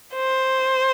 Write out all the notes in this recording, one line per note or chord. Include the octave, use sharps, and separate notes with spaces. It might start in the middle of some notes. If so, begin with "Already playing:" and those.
C5